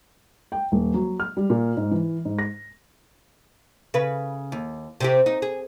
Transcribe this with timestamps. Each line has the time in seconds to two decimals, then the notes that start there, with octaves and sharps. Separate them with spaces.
0.52 G5
0.72 D#1
0.94 F#3
1.20 F6
1.37 G3
1.50 A#2
1.77 G#2
1.91 E3
2.25 G#2
2.39 A#6
3.94 C#3 B4
4.52 D#2
5.00 C3 C4 G4
5.26 D#4
5.42 G#4